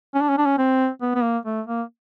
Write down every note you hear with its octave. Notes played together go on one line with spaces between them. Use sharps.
C#4
D4
C#4
D4
C#4
C4
B3
B3
A#3
A3
A#3